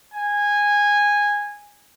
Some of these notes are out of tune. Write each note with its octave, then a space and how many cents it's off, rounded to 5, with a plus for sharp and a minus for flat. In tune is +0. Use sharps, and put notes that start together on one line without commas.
G#5 -15